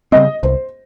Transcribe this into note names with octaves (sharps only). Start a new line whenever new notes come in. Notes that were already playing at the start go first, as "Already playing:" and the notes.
C#3 G3 C4 D#5
C2 C5